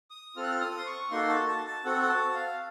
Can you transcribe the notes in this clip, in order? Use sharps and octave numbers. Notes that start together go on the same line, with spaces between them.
D#6
C4 F4 A4 F6
F#6
F6
D#6
C6
C#6
A#3 D#4 F#4 A4 C6
A5
A5
A5
C4 F#4 A4 F#5
F#5
A5
F5